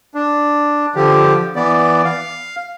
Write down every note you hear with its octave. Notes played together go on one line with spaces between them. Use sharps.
D4
D3 F3 G4
E3 B3 D5
F5